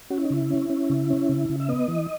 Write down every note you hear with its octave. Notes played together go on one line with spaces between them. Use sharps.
C#4 F#4
E4
D#4
C#3 E4
C#4
C#4
C#3
C#4
C#3
C#3
E5
B3 D#5
E3